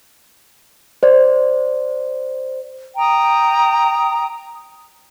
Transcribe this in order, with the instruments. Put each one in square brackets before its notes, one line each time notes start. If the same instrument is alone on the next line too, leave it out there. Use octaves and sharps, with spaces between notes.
[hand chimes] C5 D5
[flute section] G5 A#5 D#6